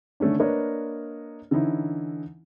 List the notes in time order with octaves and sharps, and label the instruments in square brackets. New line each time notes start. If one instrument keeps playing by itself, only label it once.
[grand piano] D3 D#3 A3 C#4 D4
A#3 D4 A#4 B4 C#5 D#5
D3 E3 C#4 D#4 E4